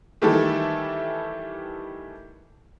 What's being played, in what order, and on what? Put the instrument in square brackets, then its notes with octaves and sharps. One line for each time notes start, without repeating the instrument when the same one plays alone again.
[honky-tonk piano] D#3 E3 G3 A3 E4 A4